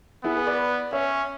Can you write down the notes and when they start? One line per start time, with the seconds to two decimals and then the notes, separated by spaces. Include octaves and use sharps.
0.24 B3 E4 G#4
0.36 G#4 B4
0.47 B4 D5
0.92 C#4 C#5 E5